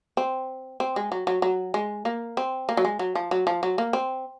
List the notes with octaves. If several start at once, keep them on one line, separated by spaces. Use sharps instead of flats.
C4
C4
G#3
F#3
F#3
F#3
G#3
A#3
C4
A#3
F#3
G#3
F#3
F3
F#3
F3
F#3
A#3
C4